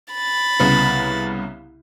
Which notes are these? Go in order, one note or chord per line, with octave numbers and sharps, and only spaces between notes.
B5 A6
C2 C#3 B3